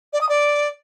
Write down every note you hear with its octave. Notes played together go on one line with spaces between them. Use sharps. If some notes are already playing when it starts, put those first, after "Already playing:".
D5
D#6
D5